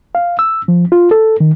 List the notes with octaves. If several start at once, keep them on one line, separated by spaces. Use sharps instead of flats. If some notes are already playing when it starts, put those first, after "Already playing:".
F5
E6
F3
F4
A4
D#3